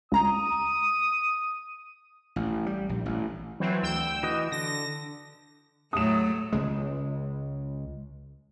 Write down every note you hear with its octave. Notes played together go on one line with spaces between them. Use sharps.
C#2 A#5 D#6
A1
G3
A#1
A1
E3 F#3 C4
D2 G5 E6
E3 F#4 D#5
D3 A#6
A2 F#3 A3 D#6 E7
C#2 G#3